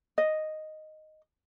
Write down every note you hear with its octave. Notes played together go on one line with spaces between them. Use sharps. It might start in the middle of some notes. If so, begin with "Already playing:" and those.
D#5